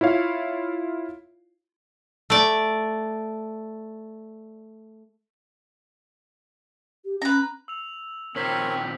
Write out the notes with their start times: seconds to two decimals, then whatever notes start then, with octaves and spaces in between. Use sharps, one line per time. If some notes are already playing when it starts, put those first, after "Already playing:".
0.01 E4 F4 C#5 F5
2.30 A3 D5
7.05 G4
7.22 C#4 B4 A#5
7.68 E6 F7
8.36 A#2 D#3 C4 A#4 C5 C#5 B6 F#7